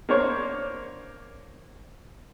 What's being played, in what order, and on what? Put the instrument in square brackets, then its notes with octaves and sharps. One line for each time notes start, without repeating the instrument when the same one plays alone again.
[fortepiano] A#3 D4 C5 C#5